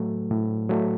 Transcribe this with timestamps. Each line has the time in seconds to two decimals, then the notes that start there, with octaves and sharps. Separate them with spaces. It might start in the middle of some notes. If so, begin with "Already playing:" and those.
Already playing: A2 F#3 A3
0.31 A2
0.69 F#3 A3